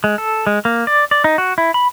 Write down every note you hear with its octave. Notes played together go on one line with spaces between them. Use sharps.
G#3
A4
G#3
A#3
D5
D5
D#4
F#4
E4
B5